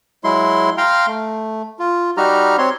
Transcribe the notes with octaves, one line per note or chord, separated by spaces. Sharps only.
F#3 G#3 E4 C6
F5 G5 A#5 C6 F6
A3
F4
G3 D#4 F#4 G4 A#5 F6
C4 C#5 C6